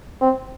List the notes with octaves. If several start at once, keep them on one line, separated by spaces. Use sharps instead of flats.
C4